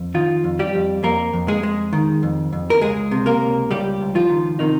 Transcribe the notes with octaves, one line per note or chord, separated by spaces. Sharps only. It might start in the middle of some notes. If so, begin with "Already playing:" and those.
Already playing: F2
D#3 F3 F4
F2
G3 G4
F2
F2 A#3 A#4
F2
G#3 G#4
G#3
D#3
F2
F2
A#4
C#2 G#3 G#4
C3
A#3 A#4
C#2
C#2 G3 G4
C#2
F3 F4
D#3
C3 D#3 D#4